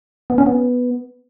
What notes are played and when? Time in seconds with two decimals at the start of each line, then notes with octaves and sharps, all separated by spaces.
0.30 B3
0.38 C#4
0.46 B3